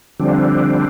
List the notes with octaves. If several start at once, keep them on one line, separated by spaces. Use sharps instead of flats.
D3 F3 G3 C4 D4